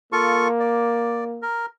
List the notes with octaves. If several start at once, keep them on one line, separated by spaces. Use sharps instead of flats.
A#3 F4 A4 C#6
D5
A#4